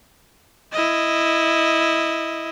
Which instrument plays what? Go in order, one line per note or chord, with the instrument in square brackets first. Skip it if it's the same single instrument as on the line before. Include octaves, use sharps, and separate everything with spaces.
[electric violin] E4 D#5